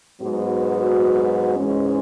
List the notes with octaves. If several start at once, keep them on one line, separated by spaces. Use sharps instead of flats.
G#2 F#3 B3 F#4
G#2 E3 G#3 C#4